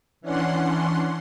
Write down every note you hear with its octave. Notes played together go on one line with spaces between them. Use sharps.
E3 C#4 D4 F#5 C6